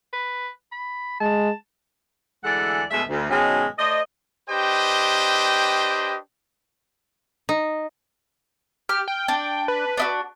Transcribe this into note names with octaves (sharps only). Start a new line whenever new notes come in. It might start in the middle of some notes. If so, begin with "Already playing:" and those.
B4
B5
G#3 A5
D2 E3 G#3 A4 D5 F#5
F#2 B2 G#3 A3 E5
D2
G#2 B2 D#3 F#3 G#3 C#4
A3 C5 D5 D#5
D4 G4 B4 C5 D#5 G5
D#4
G4 F6
G5
D4
B4
D4 D#4 F#4